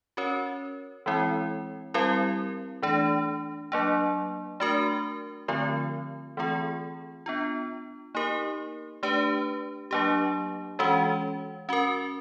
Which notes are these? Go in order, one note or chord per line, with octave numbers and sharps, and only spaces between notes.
C#4 F#4 A#4 C#5
E3 G#3 C4 E4
G3 C4 E4 G4 A#4
E3 A3 D4
F#3 A#3 D4
A3 D4 F#4 A#4
D3 F3 A3 C4 F4
E3 A3 C4 F4 G#4
B3 D4 F4
A#3 D#4 G4 A#4
A3 D4 G4 B4
F#3 A#3 D4 G4
E3 G#3 C#4 F#4
C#4 F#4 A#4